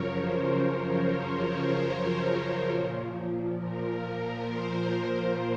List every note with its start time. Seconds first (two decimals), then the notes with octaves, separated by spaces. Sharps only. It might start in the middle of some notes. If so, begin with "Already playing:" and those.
Already playing: F#2 C#3 F3 A#4 C#5
0.11 C5
0.54 C#5
0.98 C5
1.27 A#4
2.71 A#2 F3
3.57 A#4
4.44 C5